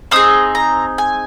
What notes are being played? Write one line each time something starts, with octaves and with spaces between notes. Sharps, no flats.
C4 D#4 G#4 D#6
A#5
G#5